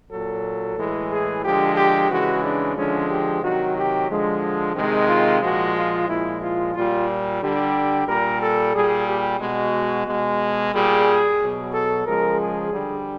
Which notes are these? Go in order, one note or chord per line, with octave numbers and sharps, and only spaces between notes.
A#2 F#3 A4
A2 E3 G#3
G#4
D3 F3 G#3 G4
G4
C#3 E3 G#3 F#4
D4
D3 F3 G#3 C#4
G4
C3 D#3 F#3 F#4
G4
D3 F3 G#3
C3 D#3 G#3
F4
A#2 F3 G#3 F#4
F4
A#2 F3 G#3 E4
F4
A#2 G3 F4
D3 G3 G4
A#2 G3 A#4
A4
A#2 G3 G#4
G4
B2 G#3 F#4
B2 G#3
A#2 G3 G#4
B2 F#3
A4
C#3 F3 G#3 A#4
G#4
D3 G3